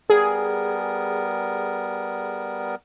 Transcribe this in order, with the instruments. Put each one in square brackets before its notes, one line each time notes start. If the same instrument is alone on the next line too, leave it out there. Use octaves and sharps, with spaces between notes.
[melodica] G3 B3 A#4 [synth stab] G#4